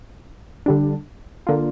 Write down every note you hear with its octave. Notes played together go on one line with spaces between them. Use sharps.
D3 G3 D4
D3 A#3 F4